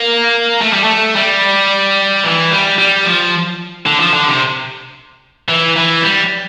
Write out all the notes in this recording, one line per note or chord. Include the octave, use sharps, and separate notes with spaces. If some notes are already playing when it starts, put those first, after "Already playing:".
Already playing: A#3
A3
G3
A3
G3
E3
G3
G3
F3
D3
F3
D3
C3
E3
E3
G3